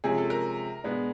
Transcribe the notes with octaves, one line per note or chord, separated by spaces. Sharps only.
C3 F3 G#3 C#4 G#4
A4
A#4
B2 G#3 B3 D4